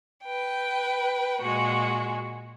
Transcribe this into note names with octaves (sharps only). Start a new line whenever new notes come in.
B4 G5
A#2 G#3 F#4